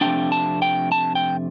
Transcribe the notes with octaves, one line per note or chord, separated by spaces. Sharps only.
F2 C3 A3 D4 G5
A5
G5
A5
G5